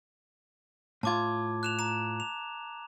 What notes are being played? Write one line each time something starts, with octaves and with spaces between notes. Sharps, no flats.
A2 F4 A5 D6 G#6
F#6 E7 F7
A#5 E7
F7